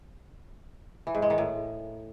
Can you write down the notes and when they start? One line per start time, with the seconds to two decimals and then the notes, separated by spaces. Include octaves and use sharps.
1.07 E3
1.15 G#2
1.22 G#3
1.30 D#3
1.38 A2